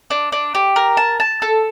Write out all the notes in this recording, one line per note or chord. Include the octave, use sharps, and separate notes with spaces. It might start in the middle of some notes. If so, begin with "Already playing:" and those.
D4
D4
G4
A#4
A5
A5
A4